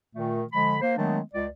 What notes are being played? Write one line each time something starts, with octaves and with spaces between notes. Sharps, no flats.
A#2 D#3 A3
D3 F3 G#3 B5
A#3 C5
D#3 F#3 G#3 A3 B3 D4
C#2 D5